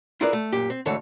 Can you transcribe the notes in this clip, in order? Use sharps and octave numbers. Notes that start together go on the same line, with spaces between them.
E4 F4 G#4 A#4 B4 D5
A3
F#2 A#2 G4
C4
D2 G#2 E3 A4 C#5